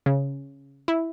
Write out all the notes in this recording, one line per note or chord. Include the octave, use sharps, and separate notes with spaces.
C#3
E4